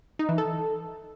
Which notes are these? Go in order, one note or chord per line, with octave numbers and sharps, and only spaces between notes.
D#4
E3
A4